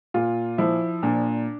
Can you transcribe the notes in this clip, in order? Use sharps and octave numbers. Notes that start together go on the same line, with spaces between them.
A#2 F4
F3 E4
A#2 D4